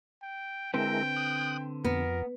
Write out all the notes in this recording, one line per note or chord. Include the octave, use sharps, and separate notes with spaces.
G5
D3 G#3 C4 E4 A#4 B4 G5
D#6 F#6
F2 B3 A#4